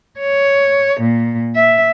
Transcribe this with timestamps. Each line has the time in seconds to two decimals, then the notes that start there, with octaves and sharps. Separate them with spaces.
0.19 C#5
1.01 A#2
1.56 E5